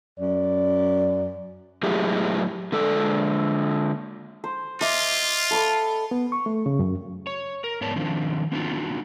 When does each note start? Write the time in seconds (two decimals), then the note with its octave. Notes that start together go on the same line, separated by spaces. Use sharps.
0.19 F#2 D5
1.83 A2 F#3 G#3 E4 G4 G#4
2.72 D3 G#3 A4 D5
4.44 C5
4.81 F4 D#5 E5 D6
5.51 A4 B5 C#6
6.11 B3
6.32 C#6
6.46 A3
6.66 C#3
6.79 F#2
7.27 C#5
7.64 A#4
7.81 G#2 B3 C#5 D5 A5
7.96 D#3 F3 C4 D4
8.52 A#3 C4 D4 D#4 F4 F#4